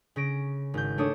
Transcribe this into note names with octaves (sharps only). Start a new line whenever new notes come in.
C#3 C#4 A#6 D7
G#1 G6
A3 D4 C#5 D#6